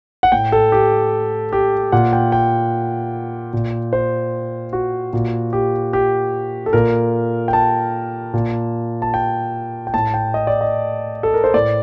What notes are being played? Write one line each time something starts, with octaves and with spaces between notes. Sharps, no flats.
F#5
A2 G5
A4
G4
G4
A#2 F#5
G5
G5
A#2
C5
F#4
A#2
G4
G4
A4
A#2 A#4
G5
A5
A#2
A5
G5
G5
A2 A5
G5
D#5
D5
D#5
A4
A#4
C5
A2 D5